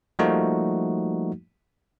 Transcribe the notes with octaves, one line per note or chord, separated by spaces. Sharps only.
F3 G3 A3 A#3 D#4 F#4